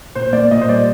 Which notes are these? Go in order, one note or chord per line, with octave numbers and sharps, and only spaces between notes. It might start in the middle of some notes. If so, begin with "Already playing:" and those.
A#2 C5
A#3 D5
A#2 D#5
C5
G3 D5